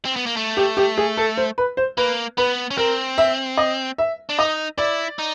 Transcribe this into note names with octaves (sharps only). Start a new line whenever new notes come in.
C4
B3
A#3
A3
G4
G4
G#4
A4
C5
B4
C5
A#3 B4
B3 B4
C#4
C4 A#4
E5
D#5
E5
D4
D#4 D#5
E4 D5
D#4